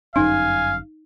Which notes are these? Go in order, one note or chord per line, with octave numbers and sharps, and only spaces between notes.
G1 F#2 C#4 D#4 F5 G#5